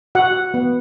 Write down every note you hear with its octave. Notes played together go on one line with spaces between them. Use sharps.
F#4 F#5
B3